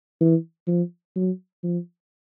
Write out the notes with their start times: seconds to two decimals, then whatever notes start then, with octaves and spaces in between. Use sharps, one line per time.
0.21 E3
0.68 F3
1.16 F#3
1.63 F3